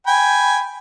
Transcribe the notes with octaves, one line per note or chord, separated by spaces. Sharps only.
G5 G#5 B5